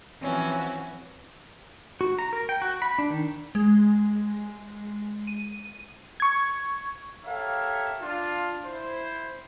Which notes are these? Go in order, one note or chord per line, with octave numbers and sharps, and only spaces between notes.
E3 F3 C4 C#4 F#4
F#4
A#5
A#4
G5
F#4
B5
D4
D#3
G#3
D#7
C#6 G#6
G4 A4 A#4 C#5 E5 F5
D4 F4
E4 C5